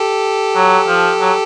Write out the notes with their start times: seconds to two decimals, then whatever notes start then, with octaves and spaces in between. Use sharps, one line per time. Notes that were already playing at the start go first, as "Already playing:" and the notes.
Already playing: G4 A4
0.55 F#3
0.87 F3
1.20 F#3